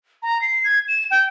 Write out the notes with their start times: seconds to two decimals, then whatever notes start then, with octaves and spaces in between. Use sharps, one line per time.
0.23 A#5
0.41 C7
0.64 G#6
0.88 E7
1.11 G5